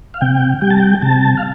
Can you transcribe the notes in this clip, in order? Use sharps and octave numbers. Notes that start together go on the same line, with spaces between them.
F5
C3 G5
G3 G5
A5
G5
C3 A5
F5